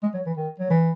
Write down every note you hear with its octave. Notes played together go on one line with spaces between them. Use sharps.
G#3
F#3
E3
D#3
F#3
E3